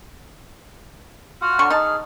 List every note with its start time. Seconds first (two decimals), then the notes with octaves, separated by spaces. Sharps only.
1.42 F4 F#4 F#5 F6
1.59 D3 F#3 C#6
1.70 D#4 G#4 A5